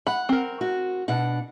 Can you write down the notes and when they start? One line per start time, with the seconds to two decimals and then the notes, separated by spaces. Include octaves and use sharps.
0.07 F#5 B5
0.29 C4 A#4
0.61 F#4
1.08 B2 D4 F#5